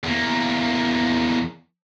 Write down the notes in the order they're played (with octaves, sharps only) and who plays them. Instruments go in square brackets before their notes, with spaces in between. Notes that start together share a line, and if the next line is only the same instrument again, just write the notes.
[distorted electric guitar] E2 A#3